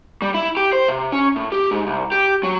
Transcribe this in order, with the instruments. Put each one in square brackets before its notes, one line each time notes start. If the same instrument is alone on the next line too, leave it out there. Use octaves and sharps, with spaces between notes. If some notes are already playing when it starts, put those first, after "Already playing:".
[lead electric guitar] G3
E4
G4
C5
C3
C#4
A2
G4
G#2
C2
G4
F#3